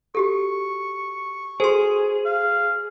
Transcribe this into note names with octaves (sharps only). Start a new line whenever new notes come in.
F#4 G4 A4 C#6
F#4 G#4 A4 C5 C6
F5